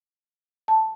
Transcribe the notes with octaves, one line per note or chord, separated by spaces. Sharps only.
A5